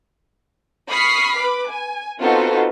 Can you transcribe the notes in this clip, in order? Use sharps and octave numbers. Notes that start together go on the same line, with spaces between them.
B5 C#6 D#6 F6 B6 C7
B4 B5 D6
G#5
B3 C4 D#4 F4 F#4 A4